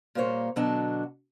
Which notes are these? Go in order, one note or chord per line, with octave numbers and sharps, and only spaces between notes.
A#2 G3 A#3 C5 C#5
B2 D3 F#3 D4 F#4 A5